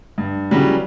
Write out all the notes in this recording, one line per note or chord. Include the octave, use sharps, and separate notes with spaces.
G2
C#3 E3 F#3 G3